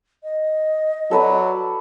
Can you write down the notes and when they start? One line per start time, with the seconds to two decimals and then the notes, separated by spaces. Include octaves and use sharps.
0.23 D#5
1.11 F#3 A4 B4 D5